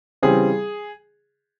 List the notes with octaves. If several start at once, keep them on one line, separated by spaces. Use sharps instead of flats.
C#3 E3 G3 C4 G#4